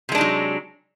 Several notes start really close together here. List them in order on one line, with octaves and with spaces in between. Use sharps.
C3 G#3 D4 D#4 F#3